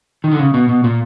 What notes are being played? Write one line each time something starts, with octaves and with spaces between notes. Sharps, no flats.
D#3
D3
C#3
B2
B2
A#2